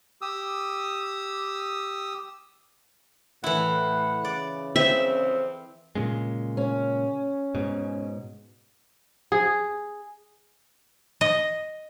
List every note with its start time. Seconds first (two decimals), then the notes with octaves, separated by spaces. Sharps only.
0.22 G4 D#6 E6
3.44 A2 E3 E4 F#5
4.25 C#3 D5
4.76 C4 E5
5.95 A#2 C#3 G#3
6.57 C#4
7.55 G#2 B2
9.32 G#4
11.21 D#5